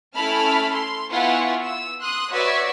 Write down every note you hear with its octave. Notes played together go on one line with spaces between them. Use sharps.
A3 C#4 E4 A5 B5 F6
C6
B3 E4 F4 F#5 G#5 C#6
E6
C6 D#6 F#6
F#4 B4 C#5 D5 E5